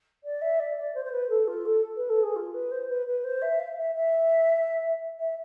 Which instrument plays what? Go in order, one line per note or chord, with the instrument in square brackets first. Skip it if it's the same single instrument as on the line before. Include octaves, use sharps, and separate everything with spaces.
[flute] D5
E5
D5
D5
C5
C5
B4
A4
F4
A4
B4
A4
G#4
F4
B4
C5
B4
B4
C5
E5
F5
E5
E5
E5